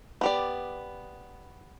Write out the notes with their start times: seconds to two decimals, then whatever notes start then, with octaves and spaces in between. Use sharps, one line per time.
0.21 B3 G4 D5